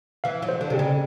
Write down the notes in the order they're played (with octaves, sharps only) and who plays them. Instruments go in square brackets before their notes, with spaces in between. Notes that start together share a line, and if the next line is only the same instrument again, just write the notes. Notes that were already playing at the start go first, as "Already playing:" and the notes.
[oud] E3 [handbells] F5
[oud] F#3
[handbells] C5
[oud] D3
[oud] C3 [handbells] G#4
[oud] C#3